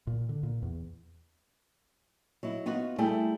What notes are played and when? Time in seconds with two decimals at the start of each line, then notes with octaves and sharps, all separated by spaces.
0.07 A#2
0.29 D3
0.43 A#2
0.62 E2
2.43 F#3 D#4 E4
2.66 B3 D#4 F4 F#4
2.98 G3 A3 E4 G#4 G5